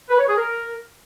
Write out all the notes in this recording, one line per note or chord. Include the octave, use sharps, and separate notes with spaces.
B4
C#5
G#4
A#4